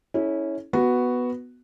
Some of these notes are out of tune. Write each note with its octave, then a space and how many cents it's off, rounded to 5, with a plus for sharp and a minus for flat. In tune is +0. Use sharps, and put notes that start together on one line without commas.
C#4 +0 E4 -25 A4 -35
B3 +0 F#4 +0